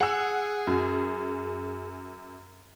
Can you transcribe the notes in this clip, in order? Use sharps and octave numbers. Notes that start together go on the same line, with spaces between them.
G#4 F#5 E6
F#2